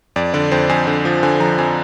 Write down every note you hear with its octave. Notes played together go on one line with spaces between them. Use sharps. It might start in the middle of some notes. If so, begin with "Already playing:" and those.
F2 D5
D3 D5
F2 C5
F2 G#5
D3
F3
D3 G#5
F3 A#5
F2 G#5